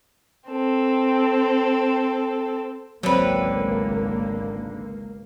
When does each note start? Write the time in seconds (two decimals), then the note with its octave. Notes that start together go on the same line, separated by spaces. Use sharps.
0.48 C4 A4
3.03 G#1 C#2 D3 F#3 A#3 C4 B4